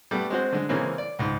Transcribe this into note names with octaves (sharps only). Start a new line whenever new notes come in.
G3 A3 B3
G#3 C4 F#4 C5
D3 G#3
C#3 E3 G#3 A#3 C4 C#4
D5
C#2 G#2